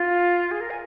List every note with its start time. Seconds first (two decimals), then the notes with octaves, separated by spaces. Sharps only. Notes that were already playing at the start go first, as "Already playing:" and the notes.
Already playing: F4
0.51 G#4
0.61 A#4
0.70 G#5